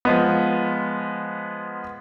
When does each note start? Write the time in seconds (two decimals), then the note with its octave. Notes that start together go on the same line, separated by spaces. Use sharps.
0.05 F3 G#3 B3